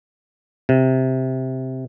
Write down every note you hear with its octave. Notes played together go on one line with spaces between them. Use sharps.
C3